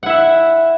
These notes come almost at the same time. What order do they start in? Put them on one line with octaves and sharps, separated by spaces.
F#5 E4 E5